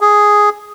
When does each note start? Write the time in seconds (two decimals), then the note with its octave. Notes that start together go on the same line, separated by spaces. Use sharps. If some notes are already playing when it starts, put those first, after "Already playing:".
0.01 G#4